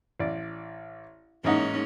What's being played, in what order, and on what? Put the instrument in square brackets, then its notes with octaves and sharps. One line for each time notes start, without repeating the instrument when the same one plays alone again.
[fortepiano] A1 D5
[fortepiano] A1 D#4 F#5 [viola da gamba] G#2 A#3 C#4